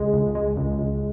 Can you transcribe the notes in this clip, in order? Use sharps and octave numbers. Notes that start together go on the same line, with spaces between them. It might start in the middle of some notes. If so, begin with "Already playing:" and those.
Already playing: C#2 G#3
C#2
G#3
C#2
C#2